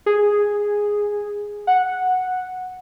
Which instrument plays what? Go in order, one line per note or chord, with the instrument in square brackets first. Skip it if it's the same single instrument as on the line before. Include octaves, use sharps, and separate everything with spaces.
[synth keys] G#4
F#5